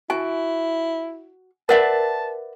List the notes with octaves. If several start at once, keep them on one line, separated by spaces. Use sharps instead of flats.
E4 F#4 G#5
A#4 B4 D5 E5 F#5 A5